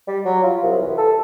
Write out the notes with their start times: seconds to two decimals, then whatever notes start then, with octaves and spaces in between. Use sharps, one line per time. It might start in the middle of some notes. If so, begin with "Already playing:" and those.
0.08 G3
0.25 F#3
0.44 F4
0.63 C2
0.82 E3
0.98 A4